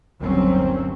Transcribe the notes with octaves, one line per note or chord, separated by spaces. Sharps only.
G1 D#2 F#3 C4 C#4